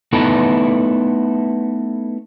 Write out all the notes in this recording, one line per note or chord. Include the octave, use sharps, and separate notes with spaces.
A3 B3 D#4 E4 A4 B4